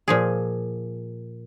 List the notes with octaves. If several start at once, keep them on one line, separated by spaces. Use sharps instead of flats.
A#2 F3 G#4